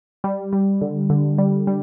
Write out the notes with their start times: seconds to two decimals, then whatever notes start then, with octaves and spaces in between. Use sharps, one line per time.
0.24 G3
0.53 G3
0.81 D3
1.10 D3
1.38 G3
1.67 G3